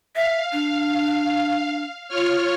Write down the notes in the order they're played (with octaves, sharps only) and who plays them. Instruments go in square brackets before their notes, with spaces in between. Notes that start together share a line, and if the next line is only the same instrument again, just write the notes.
[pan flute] E5 [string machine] F5
[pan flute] D4
[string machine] F4 C#5 F6